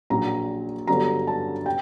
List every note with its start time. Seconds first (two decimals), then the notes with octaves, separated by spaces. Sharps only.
0.10 A#1 A#2 F#3 A#5
0.87 G1 G2 D3 F#3 A#5
1.27 A5
1.66 G5